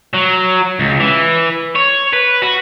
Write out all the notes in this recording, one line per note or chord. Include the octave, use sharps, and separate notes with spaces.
F#3
C#2
E3
C#5
B4
F#4